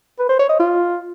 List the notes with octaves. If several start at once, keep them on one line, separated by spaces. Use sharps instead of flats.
B4
C5
C#5
D#5
F4